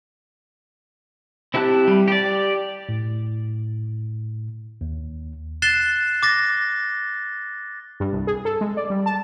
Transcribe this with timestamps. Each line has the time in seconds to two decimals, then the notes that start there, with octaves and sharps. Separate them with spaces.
1.54 C4 E4 G4 A5 F#6
1.88 G3
2.08 G4 D5
2.89 A2
4.81 D#2
5.62 F#6 A6 C7 E7 G7
6.23 D6 A6 A#6
8.00 G2
8.13 C2
8.27 G#4
8.45 A4
8.61 G#3
8.77 D5
8.90 G3
9.06 A5